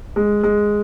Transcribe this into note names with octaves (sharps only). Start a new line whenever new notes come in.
G#3
G#3